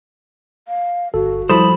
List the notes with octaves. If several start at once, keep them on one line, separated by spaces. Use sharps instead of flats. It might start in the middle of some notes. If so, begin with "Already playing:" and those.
F5
G1 F#4 A4
F3 G3 E4 A4 C5 B5 D#6